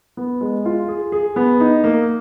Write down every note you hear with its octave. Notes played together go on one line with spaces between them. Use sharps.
B3
G#3
F4
G#4
G#4
B3
D#4
A#3